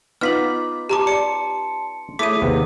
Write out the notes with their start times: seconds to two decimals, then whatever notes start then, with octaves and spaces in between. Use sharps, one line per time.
0.21 B3 D#4 F4 D6 F6 B6 F#7
0.89 G4 A5 A#5 C6 D6
1.07 D5 C#7
2.19 A3 E4 G#4 C#5 D6 D#6 B6 D#7
2.42 D#2 C3 B3